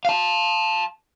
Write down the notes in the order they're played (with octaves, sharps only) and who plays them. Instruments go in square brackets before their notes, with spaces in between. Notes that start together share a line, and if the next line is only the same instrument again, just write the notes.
[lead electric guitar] F5 A5